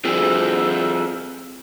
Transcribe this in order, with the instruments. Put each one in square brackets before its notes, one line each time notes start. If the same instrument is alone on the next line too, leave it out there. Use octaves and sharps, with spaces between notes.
[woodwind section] D2 E6 [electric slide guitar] C4 F4 G#4